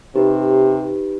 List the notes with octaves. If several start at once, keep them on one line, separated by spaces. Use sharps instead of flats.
C3 D#4 G4 B4